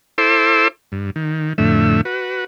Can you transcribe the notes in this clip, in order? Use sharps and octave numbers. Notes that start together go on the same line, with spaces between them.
E4 A4 C5 C6 D6 E6
G2
D#3
F2 A2 D3 A3 E5
F#4 B4